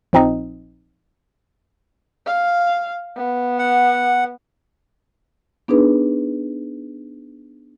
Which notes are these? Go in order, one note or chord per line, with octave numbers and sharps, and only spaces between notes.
A#1 F3 C4 D#4 D#5
F5
B3
F#5
B3 D4 D#4 G#4 B4